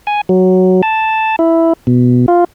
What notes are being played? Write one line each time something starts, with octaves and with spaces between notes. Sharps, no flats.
G#5
F#3
A5
E4
B2
F4